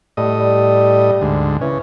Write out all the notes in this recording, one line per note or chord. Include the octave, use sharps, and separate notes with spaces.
A2 G3 D#5
G3
D2 G#2
C#3 E3